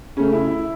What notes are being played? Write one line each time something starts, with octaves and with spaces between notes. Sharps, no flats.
C#3 A3 C#4
E4
E4